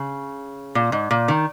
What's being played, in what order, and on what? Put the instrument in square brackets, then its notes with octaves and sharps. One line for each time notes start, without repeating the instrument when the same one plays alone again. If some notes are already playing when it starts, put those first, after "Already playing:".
Already playing: [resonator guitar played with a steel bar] C#3
A#2
G#2
A#2
D#3